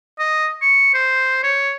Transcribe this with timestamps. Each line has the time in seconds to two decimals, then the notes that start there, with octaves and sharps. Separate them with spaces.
0.19 D#5
0.62 C#6
0.94 C5
1.43 C#5